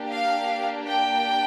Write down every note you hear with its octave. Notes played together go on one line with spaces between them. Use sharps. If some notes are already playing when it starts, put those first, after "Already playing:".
Already playing: A#3 D4 G4
F5
G5